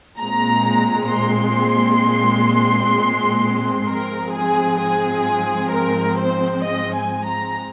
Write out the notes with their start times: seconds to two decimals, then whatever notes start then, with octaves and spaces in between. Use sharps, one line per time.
0.19 A#2 G#3 C4 A#5
1.11 C6
3.87 G#2 F3 G#3 C4 A#4
4.33 G#4
4.79 G#4
5.72 A#4
6.18 C5
6.64 D#5
6.95 G#5
7.25 A#5